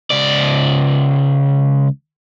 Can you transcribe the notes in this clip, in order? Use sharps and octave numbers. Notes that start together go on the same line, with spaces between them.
C#2 D5